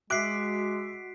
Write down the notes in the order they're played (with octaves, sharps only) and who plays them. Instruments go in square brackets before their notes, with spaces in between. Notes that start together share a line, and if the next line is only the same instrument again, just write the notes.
[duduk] G#3 [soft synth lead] F#4 [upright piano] E5 D6 F#6 [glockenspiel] B6 C7 D7